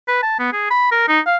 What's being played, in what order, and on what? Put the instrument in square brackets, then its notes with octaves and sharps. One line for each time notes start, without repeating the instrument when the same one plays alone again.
[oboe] B4
A5
B3
G#4
B5
A#4
D#4
F5